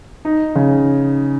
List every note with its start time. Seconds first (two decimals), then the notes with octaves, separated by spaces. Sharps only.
0.25 D#4
0.55 C#3